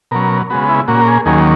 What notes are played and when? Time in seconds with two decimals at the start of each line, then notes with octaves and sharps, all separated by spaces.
0.11 B2 F#3 C#4 A#4
0.50 C#3 G#3 B3 F#4
0.69 E4
0.88 A#2 A#3 C#4 F#4
1.01 A#4
1.08 G#4
1.25 D#2 D#3 F#3 A#3 C#4 G#4